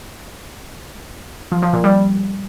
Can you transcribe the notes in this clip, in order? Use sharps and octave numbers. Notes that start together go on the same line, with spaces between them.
F3
F3
A#2
G3